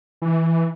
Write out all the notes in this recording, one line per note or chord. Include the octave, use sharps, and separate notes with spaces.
E3